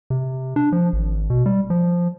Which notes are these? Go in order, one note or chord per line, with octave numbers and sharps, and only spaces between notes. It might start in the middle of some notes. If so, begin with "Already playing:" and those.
C3
D4
F3
G#1
B2
G3
F3